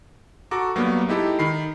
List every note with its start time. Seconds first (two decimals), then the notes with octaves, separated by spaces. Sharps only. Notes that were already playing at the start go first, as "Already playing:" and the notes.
0.51 F#4 A4 A#5 D6
0.76 G2 F#3 A#3 B3
1.08 G#3 D#4 E4 G4 A4
1.39 D#3 B5 C7